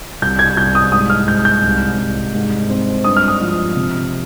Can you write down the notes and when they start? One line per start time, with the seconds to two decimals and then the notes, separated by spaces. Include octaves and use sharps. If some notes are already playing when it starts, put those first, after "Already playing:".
0.22 C2 G6
0.39 G#6
0.57 C2 G6
0.75 D#6
0.92 G#2 D#6
1.10 F6
1.28 G#2 G6
1.45 G6
1.64 C2
1.98 C2
2.35 G#2
2.70 C4
3.04 G2 D#6
3.17 F6
3.28 D#6
3.41 F3
3.76 C3